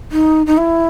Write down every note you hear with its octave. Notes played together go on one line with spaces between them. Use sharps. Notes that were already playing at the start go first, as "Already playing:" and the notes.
D#4
D#4
E4